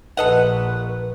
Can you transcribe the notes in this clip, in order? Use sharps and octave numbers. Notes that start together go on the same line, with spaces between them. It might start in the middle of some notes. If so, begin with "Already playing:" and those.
A#1 A4 B4 D#5 F#5